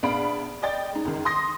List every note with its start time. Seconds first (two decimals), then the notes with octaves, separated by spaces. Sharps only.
0.03 A#1 B3 D4 F5 B5 D7
0.62 D5 D#5 G5 A6
0.93 G#3 D#4
1.05 C#2 F#2 D#3
1.25 C6 D#6 A#6